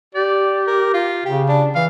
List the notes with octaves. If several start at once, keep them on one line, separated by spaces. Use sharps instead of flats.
G4 D5
A#4
F4
C#3 G4
D4
E3 F5